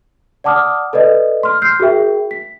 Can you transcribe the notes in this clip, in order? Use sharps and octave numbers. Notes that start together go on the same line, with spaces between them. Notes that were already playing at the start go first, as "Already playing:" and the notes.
D5 F#5 A5 D6 D#6 F6
A4 B4 D5 D#5
C6 F6
E6 F6 G6 C7
F#4 G#4 A#4 E5 G5
B6